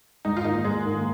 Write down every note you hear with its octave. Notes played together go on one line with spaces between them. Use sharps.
G#2 D#4
F4
D#3 A#3 D#4
G#2 G#3
D#3 A#3